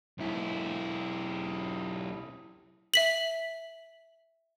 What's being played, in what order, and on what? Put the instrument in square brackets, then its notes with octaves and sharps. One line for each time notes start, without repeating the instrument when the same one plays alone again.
[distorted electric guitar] B1 E4
[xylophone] E5 B6 F#7